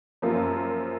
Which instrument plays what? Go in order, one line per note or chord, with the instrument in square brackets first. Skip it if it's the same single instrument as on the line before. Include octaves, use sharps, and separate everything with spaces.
[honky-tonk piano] F#2 F3 A#3 F4